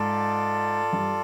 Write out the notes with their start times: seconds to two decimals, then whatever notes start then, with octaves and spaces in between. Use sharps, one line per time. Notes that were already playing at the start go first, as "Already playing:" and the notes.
Already playing: G#2 F4 A4 D5
0.93 G2